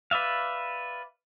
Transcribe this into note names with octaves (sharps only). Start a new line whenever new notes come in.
B4 D5 E5 F5